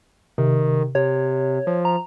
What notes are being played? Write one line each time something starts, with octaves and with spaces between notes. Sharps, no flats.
C3 D#3
C3 C#5
F3
A#5